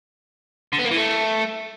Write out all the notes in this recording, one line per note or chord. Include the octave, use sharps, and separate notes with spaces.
D3
B3
A#3
E3
A3